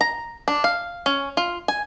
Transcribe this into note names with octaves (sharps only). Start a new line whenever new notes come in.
A#5
D4
F5
C#4
F4
G#5